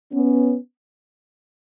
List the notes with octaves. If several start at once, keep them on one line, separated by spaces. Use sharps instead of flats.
B3 C#4